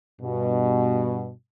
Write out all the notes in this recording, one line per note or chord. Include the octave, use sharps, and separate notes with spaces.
G2 B2